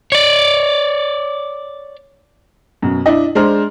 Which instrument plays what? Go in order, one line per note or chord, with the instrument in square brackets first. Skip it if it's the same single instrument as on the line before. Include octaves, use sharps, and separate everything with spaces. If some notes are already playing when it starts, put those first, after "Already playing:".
[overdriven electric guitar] C#5 D5
[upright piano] F#2 B2
D4 E4 D#5
G#3 D4 C5 A#5 F6